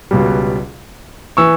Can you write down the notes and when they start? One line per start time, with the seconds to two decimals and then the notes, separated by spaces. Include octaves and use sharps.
0.11 C#2 B2 G3
1.37 E3 C#6 E6